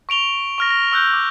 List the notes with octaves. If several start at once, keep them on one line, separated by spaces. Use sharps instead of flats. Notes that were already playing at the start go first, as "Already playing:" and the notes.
C#6 D7 F7 G7
C#6 F6 A#6
A#6
C#6 E6 F#6 G6
D6